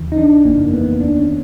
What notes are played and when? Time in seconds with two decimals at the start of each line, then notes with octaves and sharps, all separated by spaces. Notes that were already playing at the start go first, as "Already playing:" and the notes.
Already playing: D#2 C#3 E3
0.12 D#4
0.18 D4
0.45 G1 F2 C#3 E3 A#3
0.74 B3
1.00 D#2 D#3 D4
1.19 C#4